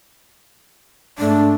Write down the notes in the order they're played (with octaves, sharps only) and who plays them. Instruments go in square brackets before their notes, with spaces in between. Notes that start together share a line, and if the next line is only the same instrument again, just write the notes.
[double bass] G#2 A3 [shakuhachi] D4